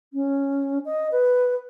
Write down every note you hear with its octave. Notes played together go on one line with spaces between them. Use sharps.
C#4
D#5
B4